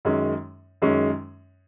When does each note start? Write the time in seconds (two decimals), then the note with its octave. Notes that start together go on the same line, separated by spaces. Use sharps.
0.05 F#2 D#3 G#3 C#4
0.82 F#2 D#3 G#3 C#4